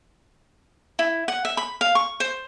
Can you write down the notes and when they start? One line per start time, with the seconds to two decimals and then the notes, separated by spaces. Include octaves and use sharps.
0.99 E4
1.28 F#5
1.45 E5
1.57 B5
1.81 F5
1.95 C#6
2.20 C5